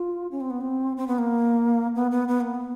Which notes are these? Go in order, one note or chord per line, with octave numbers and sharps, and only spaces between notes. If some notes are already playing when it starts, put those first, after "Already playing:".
Already playing: F4
C#4
C4
B3
C4
C4
B3
A#3
B3
B3
B3
A#3
B3